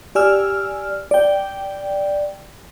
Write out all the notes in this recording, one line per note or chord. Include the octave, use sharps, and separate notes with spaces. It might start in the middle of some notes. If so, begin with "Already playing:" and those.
G4 D5 G#5 E6 F6
D5 G5